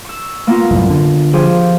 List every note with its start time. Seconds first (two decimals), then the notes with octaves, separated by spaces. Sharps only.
0.05 C#6 E6
0.47 A#3 B3 F4
0.71 C2 F#2 A2
0.90 D3
1.33 F3 G4 G#4